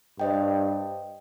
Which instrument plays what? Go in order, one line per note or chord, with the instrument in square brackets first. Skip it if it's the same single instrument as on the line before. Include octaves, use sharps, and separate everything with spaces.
[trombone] G2 [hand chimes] C5 D#5 G5